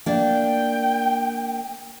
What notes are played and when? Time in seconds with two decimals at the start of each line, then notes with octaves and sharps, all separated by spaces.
0.06 A#3 D4 G5